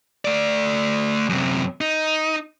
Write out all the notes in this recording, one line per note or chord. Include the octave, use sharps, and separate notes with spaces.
A3 D5
F#2 C3
D#4